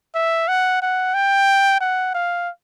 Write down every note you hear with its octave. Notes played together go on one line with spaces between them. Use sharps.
E5
F#5
F#5
G5
F#5
F5